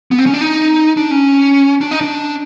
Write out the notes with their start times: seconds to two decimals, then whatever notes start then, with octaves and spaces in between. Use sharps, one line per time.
0.11 B3
0.19 C4
0.26 C#4
0.34 D4
0.41 D#4
0.97 D4
1.11 C#4
1.81 D4
1.91 D#4
2.01 D4